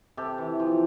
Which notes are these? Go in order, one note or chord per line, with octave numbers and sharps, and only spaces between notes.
C3 G4 A4
E3
F3